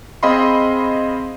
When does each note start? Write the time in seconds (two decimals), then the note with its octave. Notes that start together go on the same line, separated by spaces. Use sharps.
0.23 C4 G#4 D#5 F5 B5 C6